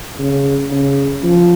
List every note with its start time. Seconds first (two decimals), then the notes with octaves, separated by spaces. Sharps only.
0.19 C#3
0.72 C#3
1.24 F3